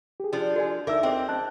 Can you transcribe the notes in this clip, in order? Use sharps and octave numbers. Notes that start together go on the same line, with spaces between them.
G4 G#4
F3 D4
F#4 A4 D5 G#5
D2 D#4 A#4 E5 D6 E6
C4 G#4 C5 D#5 G5 D6
C#4 A5 F#6